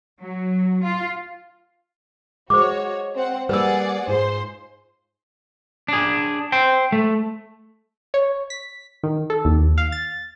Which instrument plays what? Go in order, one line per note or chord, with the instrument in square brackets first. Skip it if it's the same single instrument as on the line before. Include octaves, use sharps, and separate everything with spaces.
[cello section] F#3
F4
[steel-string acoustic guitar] G#3 [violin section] F#4 C#5 [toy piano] C5 D6
[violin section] C4 F#5
[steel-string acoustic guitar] G3 A#3 [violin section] G#4 D5 F#5 [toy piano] B4 E6
[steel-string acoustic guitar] G#2 F4 G#4 [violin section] C5 C6
[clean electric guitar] D4 G#4
C5 G5
A3
[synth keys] C#5
B6
D#3
A4
D#2
F5
A6